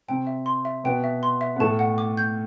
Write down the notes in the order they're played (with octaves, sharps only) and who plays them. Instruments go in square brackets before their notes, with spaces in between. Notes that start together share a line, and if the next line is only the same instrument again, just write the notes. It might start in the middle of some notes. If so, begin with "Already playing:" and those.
[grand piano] C3 C4 [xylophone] G5
[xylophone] E5
C6
E5
[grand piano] B2 B3 [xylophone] G5
[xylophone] E5
C6
E5
[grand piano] B3
[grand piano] A2 A3 [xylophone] A5
[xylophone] F#5
D6
G6